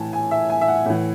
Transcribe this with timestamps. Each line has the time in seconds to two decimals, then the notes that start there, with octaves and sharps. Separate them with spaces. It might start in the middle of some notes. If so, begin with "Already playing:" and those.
Already playing: A2 E3 G#5 A5
0.13 G#5
0.31 E5
0.50 G#5
0.61 E5
0.68 F#5
0.86 A2 E3